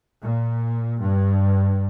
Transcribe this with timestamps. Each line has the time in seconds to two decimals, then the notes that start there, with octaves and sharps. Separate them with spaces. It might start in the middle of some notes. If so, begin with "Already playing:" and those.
0.21 A#2
0.99 G2